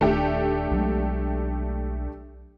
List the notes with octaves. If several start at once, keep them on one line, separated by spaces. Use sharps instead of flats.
D#1 G#1 D#3 A3 D4 G4
B1 F#3 G#3